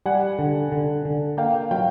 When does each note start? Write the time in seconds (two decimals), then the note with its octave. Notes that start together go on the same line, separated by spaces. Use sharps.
0.06 G3 F#5 G#5
0.39 D3
0.72 D3
1.05 D3
1.37 A#3 F5 G5
1.71 F#3 F5 G5